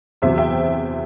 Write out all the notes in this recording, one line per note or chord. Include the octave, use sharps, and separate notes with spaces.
E2 C3 F#3 C5 E5
E5 G5